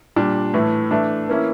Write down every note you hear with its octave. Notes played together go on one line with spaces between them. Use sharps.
A#2 G3 D4
A2 E3 A3
E3 A3 D4
E3 A#3 C#4 E4